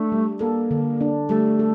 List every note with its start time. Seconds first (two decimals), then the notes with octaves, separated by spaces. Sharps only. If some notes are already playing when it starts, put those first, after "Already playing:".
Already playing: A3 D4
0.12 G3
0.41 A#3 A4
0.71 D3
1.01 D4
1.29 G3 A3
1.59 A4